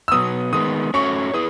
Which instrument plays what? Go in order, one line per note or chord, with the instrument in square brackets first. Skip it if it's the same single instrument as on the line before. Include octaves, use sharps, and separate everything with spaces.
[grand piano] E6
[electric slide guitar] B2 F#3 B3 [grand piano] D#6
[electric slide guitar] D#3 G#3 B3 [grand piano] D#6
[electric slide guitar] A3 C#4 F#4 C#5 [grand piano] C#6
[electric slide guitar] E4 G#4 B4 [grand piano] D#6